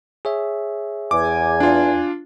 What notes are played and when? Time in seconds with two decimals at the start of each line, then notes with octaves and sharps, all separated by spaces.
0.25 G#4 C#5 E5
1.11 E2 G#5 D6
1.60 D4 F4